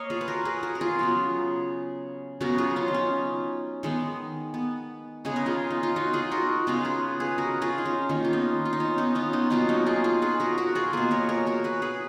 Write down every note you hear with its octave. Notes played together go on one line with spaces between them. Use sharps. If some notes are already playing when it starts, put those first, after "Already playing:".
Already playing: A#3 C#5 D#5 F5
F4 G#4
B4
F#4 A#4
G#4 B4
F#4 A#4
A#4
F4 G#4
C#3 F#3 B3
C#3 F#3 B3 F#4 A#4
F4 G#4
C#4 F4
D#4
C#4
D#3 G#3 B3
B3
C#3 G#3 B3 G#4
A#4
F4 G#4
D#4
F4
D#4 F#4
F4 G#4
F#4 A#4
C#3 G#3 B3 F4 G#4
G#4 B4
G#4 B4
F#4 A#4
F4 G#4
D#4
C#4
D#3 A#3 C#4
F4
B3 D#4
F4
D#4
C#4
B3 D#4
C#4 F4
B3 D#4
B2 F#3 A#3 C#4 F4
D#4 F#4
F4 G#4
F4 G#4
G#4 B4
F#4 A#4
F#4 A#4
F4 G#4
B2 A#3 G#4 B4
A#4 C#5
A#4 C#5
F#4 A#4
G#4 B4
G#4 B4